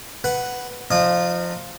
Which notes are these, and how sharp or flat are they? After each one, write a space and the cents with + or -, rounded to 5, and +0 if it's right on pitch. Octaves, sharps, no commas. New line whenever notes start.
B4 +5 F#5 +0
F3 +0 D#4 -30 D#6 -30